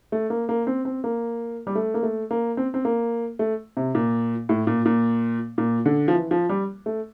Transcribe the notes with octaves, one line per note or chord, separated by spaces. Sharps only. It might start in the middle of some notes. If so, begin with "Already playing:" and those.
A3
A#3
A#3
C4
C4
A#3
G3
A3
A#3
A3
A#3
C4
C4
A#3
A3
C3
A#2
A2
A#2
A#2
A#2
D3
F3
E3
F3
G3
A3